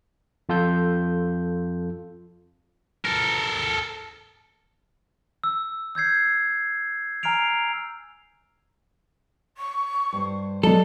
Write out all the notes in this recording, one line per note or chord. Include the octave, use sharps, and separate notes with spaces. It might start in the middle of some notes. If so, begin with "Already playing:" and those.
F2 F4 A4 G6
A4 A#4
E6
E6 G6 G#6 C7
G#5 A#5 F6 C7 D7 F7
C#6
G2 C5
F#3 G#3 B3 A4 D5